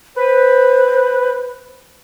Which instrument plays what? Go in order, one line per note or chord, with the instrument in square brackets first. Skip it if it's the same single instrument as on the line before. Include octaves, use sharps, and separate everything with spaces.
[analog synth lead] B4 [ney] C5